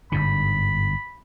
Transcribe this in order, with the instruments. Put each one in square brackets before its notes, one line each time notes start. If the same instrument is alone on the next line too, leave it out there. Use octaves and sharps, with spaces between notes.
[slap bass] G1 G#2 D3 [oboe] B5